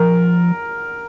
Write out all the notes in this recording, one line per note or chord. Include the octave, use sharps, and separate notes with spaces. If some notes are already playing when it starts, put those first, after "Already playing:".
Already playing: F3 A#4